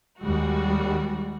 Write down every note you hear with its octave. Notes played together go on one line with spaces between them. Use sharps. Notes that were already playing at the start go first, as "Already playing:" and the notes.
D#2 G3 G#3 F#4